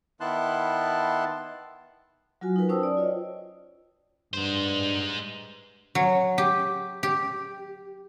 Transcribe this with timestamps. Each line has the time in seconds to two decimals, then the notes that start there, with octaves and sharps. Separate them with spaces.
0.20 D#3 B3 E4 A5 C6 F#6
2.41 F#3 F4 F#4 G#5
2.56 D#4 F#4 A#4 B4
2.69 C#4 C5 G5 A5 D#6 E6
2.83 D5
2.97 F4 C#5 D#5
4.33 G2 G#3 C5
5.95 F#3
6.38 G4
7.03 G4